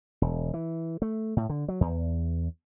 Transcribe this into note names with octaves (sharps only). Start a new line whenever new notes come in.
E1
E3
A3
A2
D3
F#3
E2